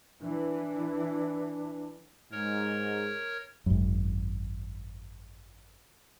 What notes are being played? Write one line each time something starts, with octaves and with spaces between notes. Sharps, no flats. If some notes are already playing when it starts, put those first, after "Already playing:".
E3 D4
G#2 A#4 C#5
G#1 F#2